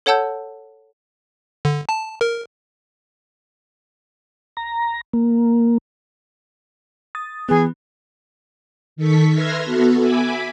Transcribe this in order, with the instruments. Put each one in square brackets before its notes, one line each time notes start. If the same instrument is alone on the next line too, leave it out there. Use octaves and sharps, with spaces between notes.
[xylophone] A4 C#5 F#5 A5 E6 G6
[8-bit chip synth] D3
A5
A#4
[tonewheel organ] A#5
A#3
[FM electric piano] D#6 A6
[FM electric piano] E3 B3 [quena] G#4
[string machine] D#3 A4 C#6 B6
B4 E5 C6 F6 G#6 A#6
B3 F#4 A4
E5 G#5 B5 D6